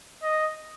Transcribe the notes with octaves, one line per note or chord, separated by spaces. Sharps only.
D#5